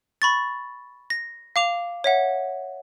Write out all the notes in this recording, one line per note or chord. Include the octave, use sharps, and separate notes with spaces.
B5 C#6 A6
A#6
F5 D6 F7
C#5 E5 F#5